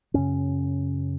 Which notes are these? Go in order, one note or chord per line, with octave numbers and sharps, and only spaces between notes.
F#2 C#3 C#4